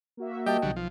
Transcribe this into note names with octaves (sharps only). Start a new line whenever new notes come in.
A#3 F#4 E5
G3 G4 D#5 G5 A5
B1 D3 F#3 G3
F3